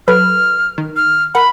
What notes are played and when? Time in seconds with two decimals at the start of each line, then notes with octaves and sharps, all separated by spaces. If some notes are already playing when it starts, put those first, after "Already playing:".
0.08 F#3 A4 B4 F6
0.78 D#3
0.96 F6
1.35 A#4 F#5 B5